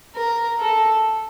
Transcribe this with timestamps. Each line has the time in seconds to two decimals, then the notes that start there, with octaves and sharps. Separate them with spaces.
0.15 A#4
0.59 A4